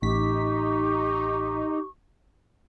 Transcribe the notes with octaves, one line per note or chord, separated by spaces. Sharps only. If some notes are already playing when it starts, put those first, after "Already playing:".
A1 D#4 G4 C#6 B6